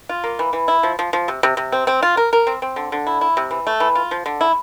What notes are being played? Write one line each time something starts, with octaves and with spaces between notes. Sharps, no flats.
F4
A#3
E3
E3
E4
F3
F3
F3
C3
C3
C3
C4
C4
F4
A#4
A#4
C4
C4
D3
D3
E4
E4
C3
E3
A3
E3
F4
F3
D3
E4